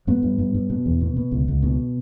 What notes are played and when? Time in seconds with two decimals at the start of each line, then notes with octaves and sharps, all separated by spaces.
0.07 G2 B3
0.23 G2
0.39 G2
0.54 G2
0.70 B2
0.86 E2
1.01 B2
1.17 B2
1.31 C#2
1.48 C#2
1.63 B2